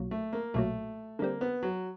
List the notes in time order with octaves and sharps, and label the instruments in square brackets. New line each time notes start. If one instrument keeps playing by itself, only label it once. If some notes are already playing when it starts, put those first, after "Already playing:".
Already playing: [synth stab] B1 A#2 F#3
[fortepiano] A3
A#3
[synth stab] B1 A#2 F#3 [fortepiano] A3
[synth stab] D3 G3 C4 [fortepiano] A#3
[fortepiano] B3
F#3